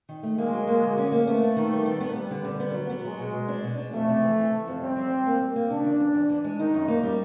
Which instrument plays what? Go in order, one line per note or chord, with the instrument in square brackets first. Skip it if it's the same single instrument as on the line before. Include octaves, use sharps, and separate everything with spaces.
[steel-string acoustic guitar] D#3
A3
[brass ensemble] G#3 [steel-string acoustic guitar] A#3
[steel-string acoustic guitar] F#3
A#3
D3
C#4
A#3
[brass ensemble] A3 [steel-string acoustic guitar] B3
[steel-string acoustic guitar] B3
D#3
G3
B3
B3
[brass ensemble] G3 [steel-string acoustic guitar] B3
[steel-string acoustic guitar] D3
D3
B3
F#3
B3
[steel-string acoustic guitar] F#3 [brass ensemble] G#3
[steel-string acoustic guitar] B2
B2
D4
B2
D4
[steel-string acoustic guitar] F2 [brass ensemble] A3
[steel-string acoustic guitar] C3
E3
E3
E3
F2
[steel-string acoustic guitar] G3 [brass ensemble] C4
[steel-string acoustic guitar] G3
G3
A#3
G3
A#3
[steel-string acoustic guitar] C#3 [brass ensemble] D4
[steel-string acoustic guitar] E2
E2
E2
E3
G#3
[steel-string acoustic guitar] D#3 [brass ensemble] D#4
[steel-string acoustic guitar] F#2
A#3
G3